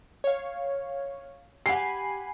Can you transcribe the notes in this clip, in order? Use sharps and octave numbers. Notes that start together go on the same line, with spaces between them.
C#5 F5
G4 F#5 G#5 B5 C7